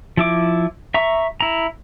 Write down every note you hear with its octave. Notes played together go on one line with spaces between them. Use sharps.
F3 E4 D6
E5 A#5 C#6
E4 A#5